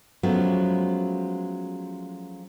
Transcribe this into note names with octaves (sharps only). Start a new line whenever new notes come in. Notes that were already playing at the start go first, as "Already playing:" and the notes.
F3 F#3 G#3 A3 B3 C#4